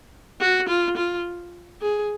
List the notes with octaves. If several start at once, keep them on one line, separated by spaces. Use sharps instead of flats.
F#4
F4
F4
G#4